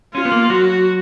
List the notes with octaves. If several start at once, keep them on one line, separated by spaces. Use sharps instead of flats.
C#4 F4
B3
A#3
F#3 F#4